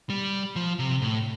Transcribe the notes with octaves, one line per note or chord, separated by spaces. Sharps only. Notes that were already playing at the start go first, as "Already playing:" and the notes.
G3
F3
C3
A2